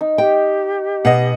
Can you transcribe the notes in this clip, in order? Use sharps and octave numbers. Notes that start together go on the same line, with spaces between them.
D#4
G4 G5
B2 D#5 F#5